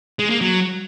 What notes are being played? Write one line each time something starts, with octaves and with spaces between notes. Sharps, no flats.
G#3
A#3
F#3